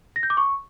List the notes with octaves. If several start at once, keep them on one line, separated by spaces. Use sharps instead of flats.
A#6
G6
D6
C#6